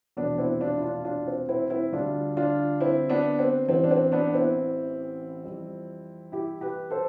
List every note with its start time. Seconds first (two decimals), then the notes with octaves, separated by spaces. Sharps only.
0.17 F1 E2 B2 B3 D4
0.38 C4 E4
0.61 D4 F4
0.77 E4
0.82 D4 F4
1.05 D4 F4
1.27 C4
1.49 C4 E4
1.70 C4 E4
1.92 D2 D3 G3 D4 F4
2.37 D4 F4
2.80 C4 E4
3.10 B3 D4
3.39 C4
3.69 A1 A2 E3 C4
3.84 D4
3.91 C4
4.12 B3 D4
4.34 C4 E4
5.44 F2 E3 G3
6.32 E4 G4
6.61 G4 B4
6.90 A4 C5